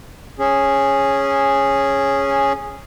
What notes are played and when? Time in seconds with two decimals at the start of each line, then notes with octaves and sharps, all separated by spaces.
0.39 C#4 G#4